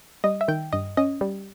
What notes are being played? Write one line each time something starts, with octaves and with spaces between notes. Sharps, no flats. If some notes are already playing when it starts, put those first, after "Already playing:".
G3 D#5
E5
D#3 G5
G2 D#5
C#4 D#5
G3